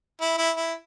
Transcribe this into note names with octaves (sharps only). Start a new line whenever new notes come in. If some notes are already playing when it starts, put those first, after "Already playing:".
E4
E4
E4